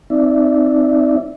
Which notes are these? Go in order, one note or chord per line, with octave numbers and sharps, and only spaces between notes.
C4 D#4 D5 E5